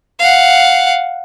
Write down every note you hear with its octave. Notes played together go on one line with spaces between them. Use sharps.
F5 F#5